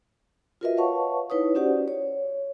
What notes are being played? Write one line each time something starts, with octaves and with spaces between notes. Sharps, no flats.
F4 F#4 A#4 B4 D#5 E5
B4 C#5 F5 F#5 A5 C#6
D#4 E4 B4 C#5 D#6
C#4 F#4 G4 C5 D5 F#5
C#5